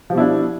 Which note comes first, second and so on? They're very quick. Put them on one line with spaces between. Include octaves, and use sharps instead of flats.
F3 G3 B2 E4 D4